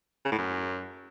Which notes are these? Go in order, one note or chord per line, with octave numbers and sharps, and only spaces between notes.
C#3
A2
F#2